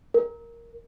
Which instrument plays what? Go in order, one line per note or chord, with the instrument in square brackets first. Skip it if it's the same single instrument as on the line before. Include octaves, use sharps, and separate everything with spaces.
[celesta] A#4